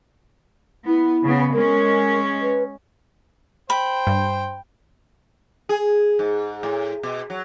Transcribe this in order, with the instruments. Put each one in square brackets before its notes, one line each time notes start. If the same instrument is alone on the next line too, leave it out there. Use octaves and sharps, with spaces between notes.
[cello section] B3 [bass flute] E4
[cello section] C#3 B3
[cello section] G#3 C#4 [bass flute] A#4
[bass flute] B4
[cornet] C5 [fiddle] G5 [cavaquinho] B5
[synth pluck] G2
[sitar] G#4
G#2
A2
B2
F#3